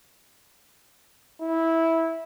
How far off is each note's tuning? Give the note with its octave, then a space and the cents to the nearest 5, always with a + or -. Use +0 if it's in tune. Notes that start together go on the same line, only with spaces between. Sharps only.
E4 -10